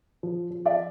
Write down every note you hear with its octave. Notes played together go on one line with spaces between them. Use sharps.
F3
F3
D5 E5